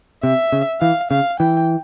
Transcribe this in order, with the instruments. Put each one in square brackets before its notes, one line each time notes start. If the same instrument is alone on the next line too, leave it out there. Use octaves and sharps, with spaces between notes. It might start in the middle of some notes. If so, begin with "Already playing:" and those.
[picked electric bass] C3 [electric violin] E5
[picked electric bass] C#3
[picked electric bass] E3 [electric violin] F5
[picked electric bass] C#3 [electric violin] F5
[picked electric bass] E3 [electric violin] G5